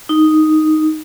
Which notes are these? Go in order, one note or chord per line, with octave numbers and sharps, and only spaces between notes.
D#4